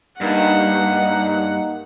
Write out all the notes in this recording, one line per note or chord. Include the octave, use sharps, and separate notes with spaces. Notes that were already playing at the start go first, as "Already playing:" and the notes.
G2 A#3 D#4 F#5